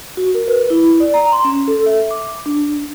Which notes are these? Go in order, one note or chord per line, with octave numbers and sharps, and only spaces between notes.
F#4
A#4
B4
E4
D5
A#5
C6
C#4
A4
E5
D6
D4